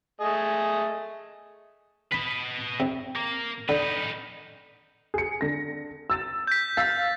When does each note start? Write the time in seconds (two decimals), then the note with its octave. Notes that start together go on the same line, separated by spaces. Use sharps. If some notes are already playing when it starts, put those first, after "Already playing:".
0.21 A3 G#4 D#5
2.12 B4 D#5 B5
2.80 C3
3.16 A#3
3.69 D3 D#4 B4
5.14 G#4 C#7
5.41 D3 A#6
6.10 E6 A6 E7
6.47 G6 B6
6.77 F5 E6 A6 B6